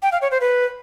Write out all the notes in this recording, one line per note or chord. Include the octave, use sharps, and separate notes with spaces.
G5
F5
C#5
C5
B4